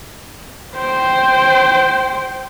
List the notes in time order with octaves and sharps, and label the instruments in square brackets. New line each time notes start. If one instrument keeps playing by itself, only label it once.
[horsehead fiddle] C5 G5